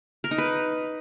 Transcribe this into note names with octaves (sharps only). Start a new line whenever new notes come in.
A#4
D#4
B4